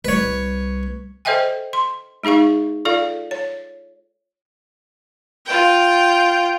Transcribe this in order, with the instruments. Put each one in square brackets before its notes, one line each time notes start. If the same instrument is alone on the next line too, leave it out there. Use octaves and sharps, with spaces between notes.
[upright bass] C2 G3 [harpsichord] B4 C#5
[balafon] A4 C5 D#5 E5 G5 G#5
C6
G#3 D#4 G#4 F5 C#6
F4 A4 D5 F5
C#5
[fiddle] F4 G5